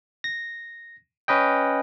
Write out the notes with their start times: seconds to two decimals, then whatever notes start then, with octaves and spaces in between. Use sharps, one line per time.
0.24 A#6
1.28 C#4 B4 D#5 G5